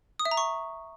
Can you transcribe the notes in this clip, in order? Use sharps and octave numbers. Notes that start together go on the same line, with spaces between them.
D#6
E5
A#5
C#6